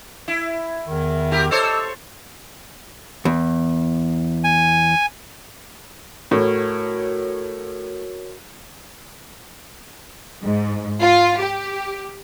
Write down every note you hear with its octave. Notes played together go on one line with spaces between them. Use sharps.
E4
E2 D#3
E4 G4 A#4
A4 C5 C#5 D#5 D6 E6
E2
G#5
A2 F#4 A#4 C#5
G#2
F4
G4